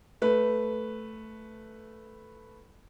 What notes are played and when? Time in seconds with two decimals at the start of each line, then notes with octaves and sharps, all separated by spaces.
0.22 A3 B4